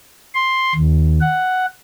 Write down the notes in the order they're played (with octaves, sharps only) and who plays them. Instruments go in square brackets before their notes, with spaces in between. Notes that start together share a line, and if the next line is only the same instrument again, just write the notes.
[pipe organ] C6
D#2
F#5